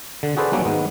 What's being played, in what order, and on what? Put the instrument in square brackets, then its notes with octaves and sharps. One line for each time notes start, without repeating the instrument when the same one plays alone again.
[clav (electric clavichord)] D3
F#4 G#4 A4 B4 C5 D5
F#3 G3 A#3 B3 C#4 D4
G#2 D#3 B3